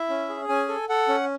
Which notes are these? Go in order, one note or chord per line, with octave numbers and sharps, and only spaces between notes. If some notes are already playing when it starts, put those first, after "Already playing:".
Already playing: E4 E5
C#4
G#4
C#4 G#5
A4
A4 F#5
C#4